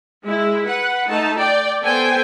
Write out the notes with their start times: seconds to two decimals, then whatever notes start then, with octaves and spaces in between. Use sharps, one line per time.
0.24 G#3 E4
0.67 B4 F#5
1.08 A3 D#4 A5
1.38 D5 G5
1.83 B3 A4 C5 G5 G#5